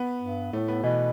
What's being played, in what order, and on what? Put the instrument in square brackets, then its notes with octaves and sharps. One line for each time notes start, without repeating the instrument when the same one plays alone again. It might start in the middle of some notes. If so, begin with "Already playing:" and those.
Already playing: [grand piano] B3
[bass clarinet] G2
[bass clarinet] A2 [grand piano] A3
[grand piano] B3
[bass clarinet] B2 [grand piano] E3